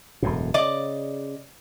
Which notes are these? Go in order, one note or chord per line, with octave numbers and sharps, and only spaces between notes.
E1 F#2 A2
C#3 D5 D#5 D6